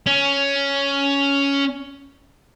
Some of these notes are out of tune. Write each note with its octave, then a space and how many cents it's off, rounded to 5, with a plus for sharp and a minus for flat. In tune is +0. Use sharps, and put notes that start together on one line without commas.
C#4 +10